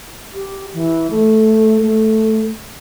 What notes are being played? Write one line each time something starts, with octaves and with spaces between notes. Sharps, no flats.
G4
E3
A3
A3